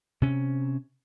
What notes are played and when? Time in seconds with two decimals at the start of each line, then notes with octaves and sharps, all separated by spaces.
0.22 C3 C#4